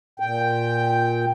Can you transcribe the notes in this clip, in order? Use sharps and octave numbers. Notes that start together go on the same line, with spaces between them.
A#2 G5